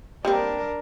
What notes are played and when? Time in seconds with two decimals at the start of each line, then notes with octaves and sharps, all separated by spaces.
0.25 G3 A#3 C4 D4 A#4